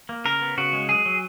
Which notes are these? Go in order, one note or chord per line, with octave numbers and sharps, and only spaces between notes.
A#3
C#3 A#4
B3
C#3 F#4
G#3
F#3 G#4
F#3